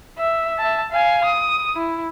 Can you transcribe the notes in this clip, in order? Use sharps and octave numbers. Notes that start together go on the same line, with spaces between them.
E5
E5 A5
F5 G#5
D#6
E4